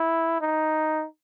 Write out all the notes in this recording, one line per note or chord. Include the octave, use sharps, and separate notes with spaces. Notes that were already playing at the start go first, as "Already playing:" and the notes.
Already playing: E4
D#4